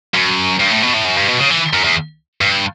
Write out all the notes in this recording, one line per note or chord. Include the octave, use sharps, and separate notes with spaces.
F#2
G2
A2
B2
A2
F#2
G2
B2
C#3
E3
F#2
E2
G2